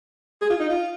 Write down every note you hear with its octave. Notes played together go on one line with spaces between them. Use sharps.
G#4
F4
D#4
F4